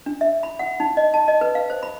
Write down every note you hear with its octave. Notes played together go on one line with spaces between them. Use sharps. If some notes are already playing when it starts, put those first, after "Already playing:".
D4
E5
B5
F#5
D#4
D#5
A5
D#5
B4
F5
C5
B5